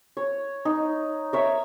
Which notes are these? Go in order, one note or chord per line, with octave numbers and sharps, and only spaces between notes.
C#5
D#4
A#4 C#5 E5